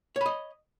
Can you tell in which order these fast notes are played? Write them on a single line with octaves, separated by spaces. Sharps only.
C#5 B5 D#5